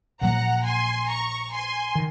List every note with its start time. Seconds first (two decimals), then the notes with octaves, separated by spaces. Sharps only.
0.21 A#1 A#2 F#3 A#3 F#5 A#5
0.65 G#5 C6
1.09 A#5 C#6
1.52 G#5 C6
1.95 D#3